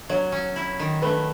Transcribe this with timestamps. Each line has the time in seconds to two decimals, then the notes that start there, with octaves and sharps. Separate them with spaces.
0.09 F#3 C#5
0.32 C#4
0.56 E4
0.79 D#3
1.02 A3 B4